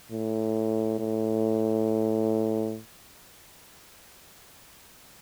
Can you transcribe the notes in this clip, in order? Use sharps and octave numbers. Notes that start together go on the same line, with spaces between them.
A2
A2